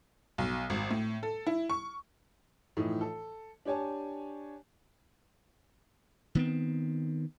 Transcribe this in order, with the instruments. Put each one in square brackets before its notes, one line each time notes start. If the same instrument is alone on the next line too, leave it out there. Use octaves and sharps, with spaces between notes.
[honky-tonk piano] B1
G#1
A2
A4
E4
C#6
[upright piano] A2 E3 F3 D#4
A4
D4 G4 C#5 G#5 A5
[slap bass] D#3 B3 C4